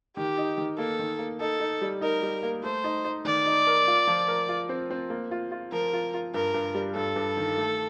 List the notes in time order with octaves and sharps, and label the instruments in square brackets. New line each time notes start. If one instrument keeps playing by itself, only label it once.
[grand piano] D#3 [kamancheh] G4
[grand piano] D#4
D#3
[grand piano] A#3 [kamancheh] A4
[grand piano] D#3
A#3
[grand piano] D#4 [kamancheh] A4
[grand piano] D#4
G3
[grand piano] D#4 [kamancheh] A#4
[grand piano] G3
A#3
[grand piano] A3 [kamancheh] C5
[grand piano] D#4
D#4
[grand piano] D#3 [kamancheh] D5
[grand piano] D#4
A#4
F4
F3
A#4
F4
C4
C4
A#3
F4
F4
[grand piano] F3 [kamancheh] A#4
[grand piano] F4
F4
[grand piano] G2 [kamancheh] A#4
[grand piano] G2
G3
[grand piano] G2 [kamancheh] A4
[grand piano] G2
D#3
A3